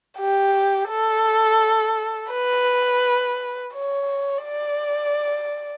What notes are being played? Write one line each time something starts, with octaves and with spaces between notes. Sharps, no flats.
G4
A4
B4
C#5
D5